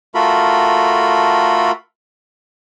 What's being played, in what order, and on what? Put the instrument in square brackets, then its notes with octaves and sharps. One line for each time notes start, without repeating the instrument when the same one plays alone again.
[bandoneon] A3 F4 F#4 A4 A#4 B5